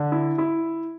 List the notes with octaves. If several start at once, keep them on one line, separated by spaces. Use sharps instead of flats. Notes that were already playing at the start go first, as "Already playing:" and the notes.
Already playing: D3
E4
E4